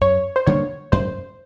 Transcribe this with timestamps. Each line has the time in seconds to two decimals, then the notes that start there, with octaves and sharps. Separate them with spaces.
0.01 F#2 C#5
0.36 C5
0.46 D3 G3 A#3 C#5
0.92 F#2 C5